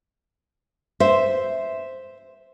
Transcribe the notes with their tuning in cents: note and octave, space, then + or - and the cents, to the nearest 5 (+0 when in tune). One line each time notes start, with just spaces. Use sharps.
C5 +0 E5 +0